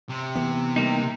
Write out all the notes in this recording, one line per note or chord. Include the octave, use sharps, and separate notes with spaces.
C3
E3 B3
G3 A#3 D#4